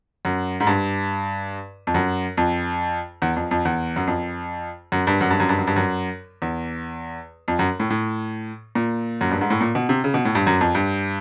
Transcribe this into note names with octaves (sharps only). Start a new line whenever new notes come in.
F#2
G#2
G2
F2
F#2
F2
E2
F2
F2
E2
F#2
F2
F#2
G2
F#2
G2
F#2
G2
F#2
G2
F#2
E2
F2
F#2
A2
A2
A#2
F#2
G2
G#2
A2
A#2
B2
C3
C#3
B2
A2
G2
F#2
F2
G2